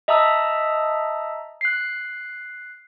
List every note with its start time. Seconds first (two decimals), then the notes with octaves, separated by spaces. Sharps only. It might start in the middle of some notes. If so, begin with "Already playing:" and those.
0.08 D#5 E5 A5 A#5 D#6 E6
1.61 F#6 C7